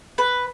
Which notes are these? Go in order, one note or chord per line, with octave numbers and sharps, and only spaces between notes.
B4